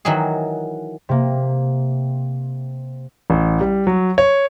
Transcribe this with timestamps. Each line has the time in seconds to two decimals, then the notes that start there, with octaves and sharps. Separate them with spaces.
0.05 D#3 E3 F#3 F#4 G#4
1.09 C3 A#3
3.30 A1
3.61 G3
3.87 F#3
4.18 C#5